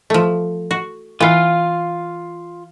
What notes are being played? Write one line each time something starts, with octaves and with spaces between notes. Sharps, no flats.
F3 A3
F#4
E3 B3 F4 F5